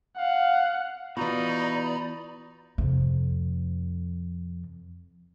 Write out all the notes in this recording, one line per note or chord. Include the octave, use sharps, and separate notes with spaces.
F5 F#5
B2 E3 D#4 F4 D5 A#5 B5
F2 C3